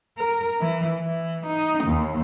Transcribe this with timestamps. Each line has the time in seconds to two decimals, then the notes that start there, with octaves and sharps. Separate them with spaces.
0.18 A#4
0.60 E3
1.01 E3
1.46 D#4
1.84 D#2